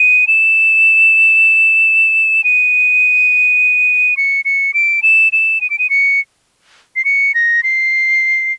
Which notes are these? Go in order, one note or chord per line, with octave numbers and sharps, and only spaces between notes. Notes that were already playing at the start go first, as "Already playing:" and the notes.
Already playing: D#7
E7
D#7
C#7
C#7
D7
E7
E7
D#7
D7
D#7
C#7
C7
C#7
A#6
C7